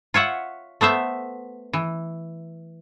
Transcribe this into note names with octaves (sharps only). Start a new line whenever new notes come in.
F4 C#5 E5 F#5
A3 B3 C5 E5
E3